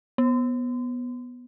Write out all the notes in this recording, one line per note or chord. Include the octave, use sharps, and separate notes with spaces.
B3